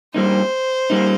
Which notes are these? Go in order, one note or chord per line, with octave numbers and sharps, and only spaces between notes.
G2 G3 A#3 D#4 C5
G3 A#3 D#4